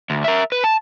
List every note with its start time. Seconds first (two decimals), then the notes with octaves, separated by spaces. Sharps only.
0.10 D2
0.24 A#4 E5
0.52 B4
0.64 A5